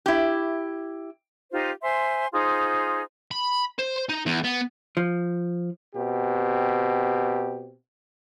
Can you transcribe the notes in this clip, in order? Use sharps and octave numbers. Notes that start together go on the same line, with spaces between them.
E4 G4
D#4 F4 G4 C5
C5 E5 G#5 C6
D#4 F4 G#4 C5
B5
C5
D#4
E2
B3
F3
B2 C4 G4